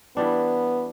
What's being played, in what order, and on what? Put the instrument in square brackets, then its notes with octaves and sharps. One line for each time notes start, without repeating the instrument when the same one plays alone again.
[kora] E3 G3 D4 [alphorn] B3